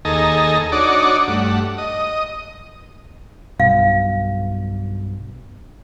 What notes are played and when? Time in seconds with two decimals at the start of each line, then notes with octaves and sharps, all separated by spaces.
0.05 D#2 G#4 A4 D#5 A#5
0.72 D4 D#4 F#4 C#5 D5
1.28 G2 A3 F#5
1.78 D#5
3.60 B1 G2 B2 F5